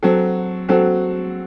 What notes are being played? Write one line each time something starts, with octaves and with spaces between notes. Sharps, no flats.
F#3 C4 F#4 A4
F#3 C4 F#4 A4